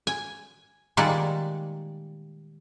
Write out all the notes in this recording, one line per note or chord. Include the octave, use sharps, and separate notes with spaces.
G#5
A#2 D#3 G3 G#3 D5 F#5